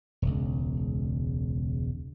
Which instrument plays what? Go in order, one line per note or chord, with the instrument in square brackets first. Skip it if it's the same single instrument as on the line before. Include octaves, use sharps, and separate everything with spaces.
[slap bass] E1 C#2